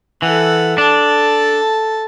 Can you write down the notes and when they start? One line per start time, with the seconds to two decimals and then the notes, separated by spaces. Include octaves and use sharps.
0.22 E3 A4 F#5
0.78 D4 A4 A5